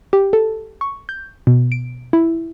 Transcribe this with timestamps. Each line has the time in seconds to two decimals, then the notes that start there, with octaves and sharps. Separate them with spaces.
0.13 G4
0.33 A4
0.81 C#6
1.09 G6
1.47 B2
1.72 D7
2.13 E4